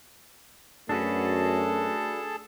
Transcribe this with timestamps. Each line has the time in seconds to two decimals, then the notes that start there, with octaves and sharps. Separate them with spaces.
0.89 F#2 A3 D4 F#4 G#4 A4 B4 A5